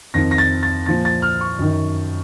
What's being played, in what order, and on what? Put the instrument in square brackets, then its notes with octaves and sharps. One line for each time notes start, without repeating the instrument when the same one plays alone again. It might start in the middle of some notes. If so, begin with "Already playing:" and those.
[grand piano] F2 D#3 A#6
A#6
A6
A6
A#2 F3 A6
A6
F6
C#6
F#2 D#3